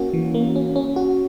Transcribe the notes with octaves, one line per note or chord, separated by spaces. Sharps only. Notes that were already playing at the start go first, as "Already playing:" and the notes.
Already playing: A#3 C#4 F#4
E3
A#3
C#4
C#4
F#4